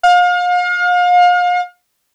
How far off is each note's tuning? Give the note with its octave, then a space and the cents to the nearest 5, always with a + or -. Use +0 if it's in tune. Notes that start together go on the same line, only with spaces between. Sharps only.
F5 +35